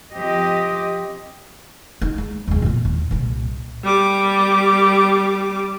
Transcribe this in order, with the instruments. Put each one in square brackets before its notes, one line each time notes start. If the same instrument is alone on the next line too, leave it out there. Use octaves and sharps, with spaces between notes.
[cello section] F3 C4 G4 D#5
[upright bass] D#4
G#3
D#1 G#3
A#2 B3
D#2
C2 A#2
[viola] G3 D6